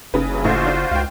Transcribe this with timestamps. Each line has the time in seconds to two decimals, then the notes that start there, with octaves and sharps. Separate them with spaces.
0.14 F#1 C#3 B4
0.30 G2 E3 F#3
0.44 A1 A3 F4 F#4 C5 C#6
0.67 D4
0.91 C#2 F5 G5